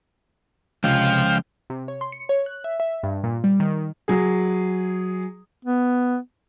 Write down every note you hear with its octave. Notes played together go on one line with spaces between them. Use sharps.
C#2 C3 F3 F5 G5
C3
C#5
C6
C#7
C#5
F#6
E5
E5
G2
A#2
G3
D#3
F#3 G#4
B3